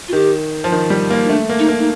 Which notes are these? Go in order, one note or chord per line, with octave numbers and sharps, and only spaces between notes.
F4
D#3 G4
F3
D#3
G3
A#3
D#4
A3 D4
A#3
D#4
A#3
D#4